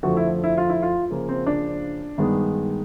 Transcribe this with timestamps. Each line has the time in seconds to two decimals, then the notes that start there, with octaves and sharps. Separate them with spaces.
0.03 F2 D3 F3 A3 F#4
0.17 E4
0.44 E4
0.57 F4
0.69 E4
0.82 F4
1.11 C#3 F3 A#3
1.29 C4
1.46 D4
2.18 G2 D#3 G#3 B3